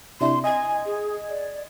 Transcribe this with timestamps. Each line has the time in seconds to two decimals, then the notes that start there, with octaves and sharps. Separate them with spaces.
0.21 C3 D4 E4 C6
0.44 D#5 G#5 G#6
0.86 G#4
1.30 D5